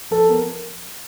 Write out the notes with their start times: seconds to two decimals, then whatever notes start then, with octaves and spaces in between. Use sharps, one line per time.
0.11 F3 A4
0.29 B3 A#4